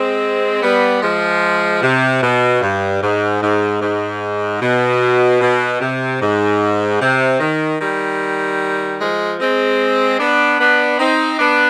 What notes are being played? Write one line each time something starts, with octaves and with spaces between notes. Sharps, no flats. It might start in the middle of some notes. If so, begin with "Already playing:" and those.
Already playing: G#3 C4
G3 B3
F3 G#3
C3
B2
G2
G#2
G#2
G#2
B2
B2
C3
G#2
C3
D#3
D#3 G3
F3 G#3
G#3 C4
B3 D4
B3 D4
C4 D#4
B3 D4